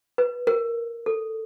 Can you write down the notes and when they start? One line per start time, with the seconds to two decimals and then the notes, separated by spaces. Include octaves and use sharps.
0.18 B4
0.47 A#4
1.06 A4